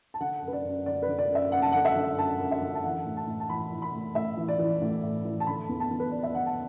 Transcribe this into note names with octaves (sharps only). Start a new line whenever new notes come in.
A5
D3 F#5
F#2
B4
D5
F#2
D3 D5
B4
D3
D5
F#2 E5
F#2 F#5
A5
D3 F#5
E5
D3
F#2 A5
F#2
E5
D3
A5
E3 F#5
A2
A5
A2
A5
E3 B5
E3
B5
A2
A2 E5
E3
D5
E3
A2
A2
E3
A5
D3 B5
E2
A5
E2
B4
D3 D5
E5
D3 F#5
A5